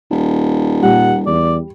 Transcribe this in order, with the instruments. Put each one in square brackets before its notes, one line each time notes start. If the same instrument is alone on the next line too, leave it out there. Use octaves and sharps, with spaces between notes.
[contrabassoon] D#1
[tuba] A#2 [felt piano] G3 [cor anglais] F#5
[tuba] E2 [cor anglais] D5